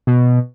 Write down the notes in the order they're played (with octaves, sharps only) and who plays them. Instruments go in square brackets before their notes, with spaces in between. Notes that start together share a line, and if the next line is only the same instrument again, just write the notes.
[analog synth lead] B2